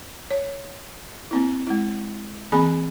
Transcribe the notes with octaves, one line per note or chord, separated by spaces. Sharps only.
C#5
A#3 C4 E4
G#3 E4
E3 A#3 C4 G#4 G#5 B5